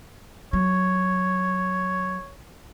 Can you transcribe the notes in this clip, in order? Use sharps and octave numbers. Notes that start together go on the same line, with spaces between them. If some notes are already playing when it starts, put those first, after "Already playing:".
F#3 C#5